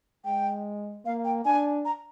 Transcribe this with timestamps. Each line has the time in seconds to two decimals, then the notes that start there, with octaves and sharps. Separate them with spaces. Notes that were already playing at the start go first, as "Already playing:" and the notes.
0.25 G#3 G5
1.05 A#3 F5
1.24 G5
1.45 D4 G#5
1.85 A#5